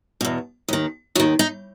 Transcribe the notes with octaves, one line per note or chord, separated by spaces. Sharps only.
E2 B2
D#2 D#3
D#2 D#3 F#4
D#4